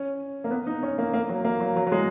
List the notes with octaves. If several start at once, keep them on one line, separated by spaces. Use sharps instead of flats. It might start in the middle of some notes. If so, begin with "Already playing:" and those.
Already playing: C#4
A#3
B3
D#4
C#4
A#3
A#3
F#3
A#3
F#3
F#3
F#3
G#3